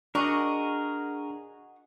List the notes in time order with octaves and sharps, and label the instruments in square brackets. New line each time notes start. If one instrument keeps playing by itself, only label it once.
[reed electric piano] D4 [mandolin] F#4 D#5 C#6 [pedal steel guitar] G#4 A#4